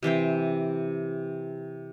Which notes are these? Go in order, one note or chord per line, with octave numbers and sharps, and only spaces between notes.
C3 E3 C5 G5